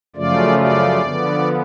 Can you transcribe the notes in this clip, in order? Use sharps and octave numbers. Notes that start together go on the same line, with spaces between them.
F#2 C#3 F3 A3 F4 D5
D5
D3 F3 B3